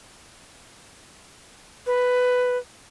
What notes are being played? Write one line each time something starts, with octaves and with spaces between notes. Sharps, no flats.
B4